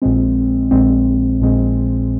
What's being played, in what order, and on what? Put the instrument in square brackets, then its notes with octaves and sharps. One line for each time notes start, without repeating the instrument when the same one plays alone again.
[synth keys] A#1 A#2 G#3 C4
A#1 A#2 G#3 C4
A#1 A#2 G#3 C4